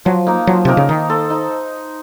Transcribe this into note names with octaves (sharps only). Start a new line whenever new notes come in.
F3 F#3
A#3 D#4 A#4
F3 F#3
C3 A#3 D#4 A#4
C#3
D#3 D#4
A4 C5 D#5
D#4